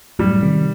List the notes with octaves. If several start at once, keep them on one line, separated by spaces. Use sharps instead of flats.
F#2 A2 G3
C3 D#3